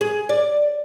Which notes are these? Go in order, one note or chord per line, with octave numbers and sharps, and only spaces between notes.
G#4
D5